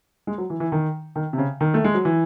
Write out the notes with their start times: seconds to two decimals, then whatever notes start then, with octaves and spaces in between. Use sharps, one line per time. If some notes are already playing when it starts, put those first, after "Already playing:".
0.27 G#3
0.38 F#3
0.50 E3
0.60 E3
0.72 D#3
1.16 D#3
1.33 C3
1.38 C#3
1.61 D#3
1.74 A3
1.84 G#3
1.94 F#3
2.05 E3